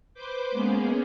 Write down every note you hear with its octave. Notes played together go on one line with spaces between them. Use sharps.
B4 C5 D6 G6
G#3 A#3 B3 C#4 G#4